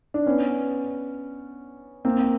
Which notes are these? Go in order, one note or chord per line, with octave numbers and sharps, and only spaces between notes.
D4
B3 C#4
A#3 C4